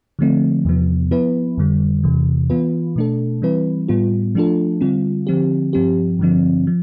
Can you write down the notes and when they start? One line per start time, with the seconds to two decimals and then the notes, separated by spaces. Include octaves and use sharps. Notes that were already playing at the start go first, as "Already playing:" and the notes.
0.19 D3 F3 A3 C4
0.65 E2 C3 F3 B3
1.11 F3 B3 E4 B4
1.57 F2 D3 G3
2.04 E2 C3 E3
2.50 E3 B3 F4 B4
2.96 B2 A3 D4 A4
3.42 E3 G3 C4 E4 B4
3.88 A2 G3 B3 F4
4.35 F3 A3 D4 F4 A4
4.81 D3 G3 C4 F4
5.27 D3 F3 C4 G4
5.73 G2 F3 C4 G4
6.19 G2 D3 F3 C4
6.67 F3